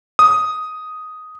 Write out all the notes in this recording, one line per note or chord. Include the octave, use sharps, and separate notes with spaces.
D#6